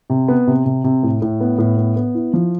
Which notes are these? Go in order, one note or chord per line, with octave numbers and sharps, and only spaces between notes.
C3
B3
C3
C3
C3
A2
A2
B3
A2
B3
B3
E4
F3